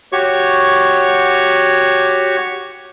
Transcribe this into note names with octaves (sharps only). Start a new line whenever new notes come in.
F#4 G4 C#5 C#6